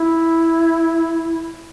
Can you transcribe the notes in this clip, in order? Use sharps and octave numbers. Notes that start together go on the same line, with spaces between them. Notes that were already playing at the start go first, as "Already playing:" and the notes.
Already playing: E4